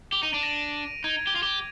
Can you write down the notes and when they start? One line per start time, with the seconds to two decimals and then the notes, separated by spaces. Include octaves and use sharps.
0.13 G4 F7
0.23 D#4 D#7
0.33 D4 D7
0.43 A#6
1.04 D#4 G#6
1.27 G4
1.36 F4
1.43 G4